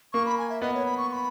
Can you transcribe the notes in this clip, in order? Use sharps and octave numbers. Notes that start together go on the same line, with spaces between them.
A#3 C#6
B5
G#5
E5
B3 D#5
C#5
B5
C#6
C#6
B5